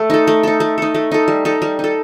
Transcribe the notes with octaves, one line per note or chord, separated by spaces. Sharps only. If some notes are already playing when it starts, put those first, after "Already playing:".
Already playing: A3
D#4 A4
A3
D#4 A4
A3
D#4 A4
A3
D#4 A4
G3
D#4 A4
G3
D#4 A4